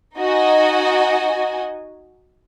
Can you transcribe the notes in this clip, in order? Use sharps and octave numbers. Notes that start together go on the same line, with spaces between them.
D#4 F#4 D#5 G#5